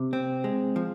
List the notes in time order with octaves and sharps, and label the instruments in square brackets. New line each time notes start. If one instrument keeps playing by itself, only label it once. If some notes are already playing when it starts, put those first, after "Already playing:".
Already playing: [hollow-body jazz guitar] C3
C4
G#3
F3